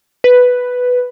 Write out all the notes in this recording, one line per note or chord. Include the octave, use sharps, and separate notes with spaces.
B4